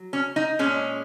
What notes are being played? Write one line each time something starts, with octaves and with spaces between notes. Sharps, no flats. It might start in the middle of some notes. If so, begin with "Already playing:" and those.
Already playing: F#3
C#4
D#4
A#2 G#3 C#4